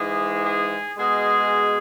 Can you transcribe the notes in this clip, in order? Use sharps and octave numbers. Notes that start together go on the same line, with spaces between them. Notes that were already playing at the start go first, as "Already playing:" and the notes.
Already playing: G#2 E3 G#3 G#4
G#4
B2 G#3 G#4